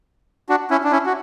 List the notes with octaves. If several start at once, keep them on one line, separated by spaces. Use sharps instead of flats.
D4 F#4
C#4 E4
D4
C#4 E4
F#4